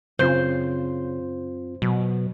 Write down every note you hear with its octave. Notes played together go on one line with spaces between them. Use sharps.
F#2 C#3 C4 F4 C5
B2 F#3